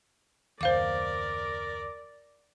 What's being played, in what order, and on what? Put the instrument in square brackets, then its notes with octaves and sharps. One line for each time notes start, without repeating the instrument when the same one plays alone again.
[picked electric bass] F#1 D#2 [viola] A#4 D5 [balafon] C5 F5 D6